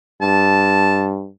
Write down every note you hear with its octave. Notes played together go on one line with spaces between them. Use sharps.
G2 A5